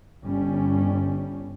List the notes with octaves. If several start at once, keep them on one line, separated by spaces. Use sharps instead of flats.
G1 G3 C#4